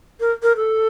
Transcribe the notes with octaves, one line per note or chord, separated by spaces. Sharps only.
A#4
A#4
A4